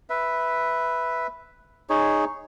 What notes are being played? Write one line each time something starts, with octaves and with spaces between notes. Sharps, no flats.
B4 E5
D#4 G#4 C#5